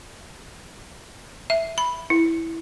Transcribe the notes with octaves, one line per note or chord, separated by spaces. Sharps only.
E5
B5
E4